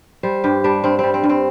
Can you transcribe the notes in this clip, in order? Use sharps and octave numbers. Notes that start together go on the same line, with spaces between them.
G3 C5
G2 G4
G3 D4
G2 C4
G3 C4
C4
G2
C4